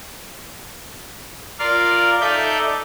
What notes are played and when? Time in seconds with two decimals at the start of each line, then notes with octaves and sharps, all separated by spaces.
1.59 F4 A#4 D5 F5
2.21 D#4 A4 D5 E5 G6